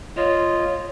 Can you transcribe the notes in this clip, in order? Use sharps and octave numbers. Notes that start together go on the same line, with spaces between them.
F4 C#5 D#5